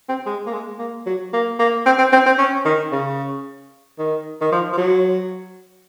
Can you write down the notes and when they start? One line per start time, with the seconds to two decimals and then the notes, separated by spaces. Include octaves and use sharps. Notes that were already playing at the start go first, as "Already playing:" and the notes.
0.09 C4
0.26 G#3
0.46 A#3
0.53 G#3
0.79 A#3
1.06 F#3
1.33 A#3
1.59 A#3
1.86 C4
1.98 C4
2.12 C4
2.26 C4
2.38 C#4
2.65 D#3
2.92 C#3
3.99 D#3
4.41 D#3
4.52 F3
4.73 F3
4.77 F#3